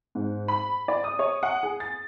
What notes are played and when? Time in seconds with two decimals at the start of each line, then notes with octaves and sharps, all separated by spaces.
0.15 G#2
0.48 B5
0.88 D5
1.04 D#6
1.19 C#5
1.43 F#5
1.63 G#4
1.80 A6